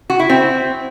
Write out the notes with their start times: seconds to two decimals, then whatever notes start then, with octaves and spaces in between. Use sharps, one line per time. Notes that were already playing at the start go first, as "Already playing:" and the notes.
0.10 F#4
0.20 E4
0.30 C4